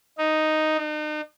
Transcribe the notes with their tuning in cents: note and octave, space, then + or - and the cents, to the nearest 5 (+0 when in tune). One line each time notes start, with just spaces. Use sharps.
D#4 +0
D#4 -40